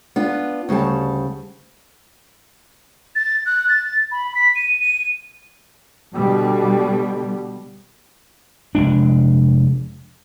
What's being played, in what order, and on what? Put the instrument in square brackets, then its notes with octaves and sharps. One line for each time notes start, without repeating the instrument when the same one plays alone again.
[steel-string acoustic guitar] B3 D4 F4
D2 C#3 G3 A5
[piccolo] A6
F#6
A6
B5
B6
D#7
D#7
[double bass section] B2 D3 G3
[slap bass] F1 G#3 D4